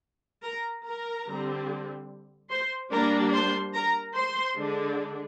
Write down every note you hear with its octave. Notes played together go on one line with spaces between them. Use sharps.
A#4 A#5
A#4 A#5
D3 G3 C4
C5 C6
G3 A#3 D4 A#4 A#5
C5 C6
A#4 A#5
C5 C6
D3 G#3 D4